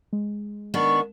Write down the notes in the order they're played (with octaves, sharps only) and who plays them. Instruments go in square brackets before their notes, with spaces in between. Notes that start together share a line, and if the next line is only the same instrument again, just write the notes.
[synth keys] G#3
[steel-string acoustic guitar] D#3 B3 D4 [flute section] C#6